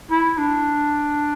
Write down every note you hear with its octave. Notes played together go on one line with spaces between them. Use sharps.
E4
D4